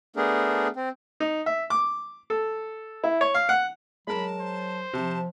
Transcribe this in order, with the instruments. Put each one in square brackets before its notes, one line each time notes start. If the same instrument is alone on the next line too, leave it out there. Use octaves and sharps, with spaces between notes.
[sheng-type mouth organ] A3 B3 D4 G#4 A#4
C4
[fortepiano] D#4
E5
D6
A4
E4
C#5
F5
F#5
[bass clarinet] F#3 [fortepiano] G#3 A#4 [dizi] A5 [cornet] B5
[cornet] C5
[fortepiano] C3 [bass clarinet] F3 [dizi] A5